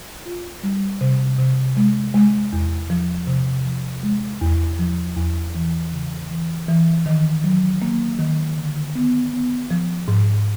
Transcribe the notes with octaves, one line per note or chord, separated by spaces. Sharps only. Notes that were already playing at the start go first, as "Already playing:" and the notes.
F4
G3
C3
C3
G#3
G#3
E2
F3
C3
F3
G#3
E2
F3
E2
E3
C#3
E3
E3
D#3
F#3
A#3
D#3
D3
B3
B3
F3
G#2